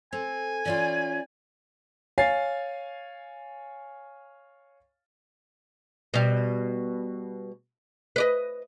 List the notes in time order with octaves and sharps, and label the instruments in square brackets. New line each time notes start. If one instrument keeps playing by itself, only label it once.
[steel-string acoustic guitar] C4 A4 [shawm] G#5
[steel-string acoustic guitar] E3 C#4 F4 [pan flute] D5
[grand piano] C#5 F5 G#5 A6 C7
[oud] B2 G3
B4 D5 D#5